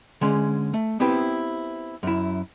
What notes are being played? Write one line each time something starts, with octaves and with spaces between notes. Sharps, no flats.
D3 G#3 C#4
A3
B3 C4 E4 G4 B4
F#2 E4